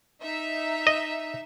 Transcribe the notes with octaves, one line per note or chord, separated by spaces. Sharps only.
D#4 E5
D#5